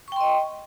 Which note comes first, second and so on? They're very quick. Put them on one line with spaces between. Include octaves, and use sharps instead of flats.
C#6 G5 C6 D#5